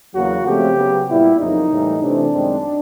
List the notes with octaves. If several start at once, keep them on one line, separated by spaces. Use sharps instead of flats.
E2 C#3 F#3 A#3 F#4
C#3 F3 A3 C4 G4
C#3 F#3 B3
A#2 G3 B3 E4
F2 C#3 F#3 A#3 D#4
A2 E3 G3
C3 E3 A3 C4 D4
F#2 D#3 G#3 C4